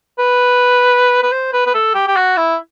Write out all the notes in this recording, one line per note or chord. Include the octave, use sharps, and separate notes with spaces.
B4
B4
C5
B4
B4
A4
G4
G4
F#4
E4